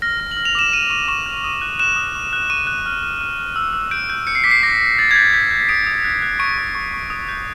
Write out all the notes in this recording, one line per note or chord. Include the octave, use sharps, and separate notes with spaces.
F6 A#6
F6
F#7
F6
F7
D6 E7
F6 D#7
C#6 D#7
C#6 E7
F6
D#6
F#6
F#6 E7
D#6
C#6
F#6
C#6 D#7
F#6
F6
F6
F6
F6
E6
E6
G6 D7
G6
G6 C#7
C7
D6 B6
C7
D6 A#6
D6
D#6 A6
G#6
G6 A6
G6 B6
G6
D#6 D7
D#6
F#6
F#6
C#6 D7
C#6
C#6
C#6
D#6
G6